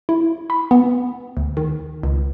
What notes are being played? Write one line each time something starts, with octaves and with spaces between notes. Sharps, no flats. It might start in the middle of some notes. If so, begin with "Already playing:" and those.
E4
B5
B3
D2
D#3
C#2